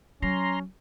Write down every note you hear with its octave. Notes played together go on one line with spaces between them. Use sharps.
F#3 C#4 A#5 C6